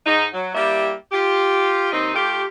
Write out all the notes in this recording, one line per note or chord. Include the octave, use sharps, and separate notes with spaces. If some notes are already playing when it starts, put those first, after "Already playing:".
G#2 D#4
F#3
G3 A#3 E4 G4 E5
F4 G4
D#2 C4 D#4
A3 F4 G4